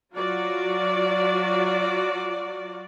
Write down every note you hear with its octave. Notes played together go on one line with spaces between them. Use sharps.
F#3 F4 F#4 D5